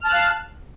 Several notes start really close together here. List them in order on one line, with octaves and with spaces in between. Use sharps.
F6 A5 F#6 F5